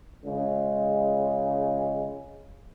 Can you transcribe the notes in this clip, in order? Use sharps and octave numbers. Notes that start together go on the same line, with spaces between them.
C#2 C#3 G#3